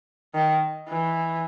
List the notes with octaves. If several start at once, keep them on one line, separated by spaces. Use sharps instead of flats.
D#3
E3